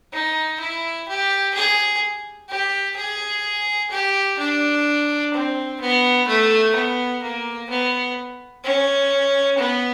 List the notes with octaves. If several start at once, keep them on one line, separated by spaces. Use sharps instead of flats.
D#4
E4
G4
G#4
G4
G#4
G4
D4
C4
B3
A3
B3
A#3
B3
C#4
B3